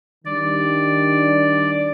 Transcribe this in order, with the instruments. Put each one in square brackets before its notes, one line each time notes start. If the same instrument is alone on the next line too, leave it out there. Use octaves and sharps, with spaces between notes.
[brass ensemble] D#3 G3 D4 [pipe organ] D5